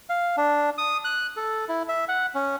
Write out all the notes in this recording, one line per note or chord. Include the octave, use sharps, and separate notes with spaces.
F5
D4
D#6
F#6
A4
E4
E5
F#5
C#4